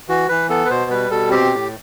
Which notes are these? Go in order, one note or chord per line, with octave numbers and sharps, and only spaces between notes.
E3 F#4
E3 B4
B3 A4
B4
B2 C5
G3 B4
B2 A4
C4 G4
A2